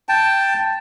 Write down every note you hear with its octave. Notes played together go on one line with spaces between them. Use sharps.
G5 A5